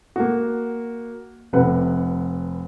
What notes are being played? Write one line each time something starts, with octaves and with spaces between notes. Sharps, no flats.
A#3 F#4
F1 C3 B4 F#5